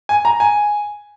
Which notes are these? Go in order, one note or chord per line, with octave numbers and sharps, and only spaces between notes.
G#5
A#5
G#5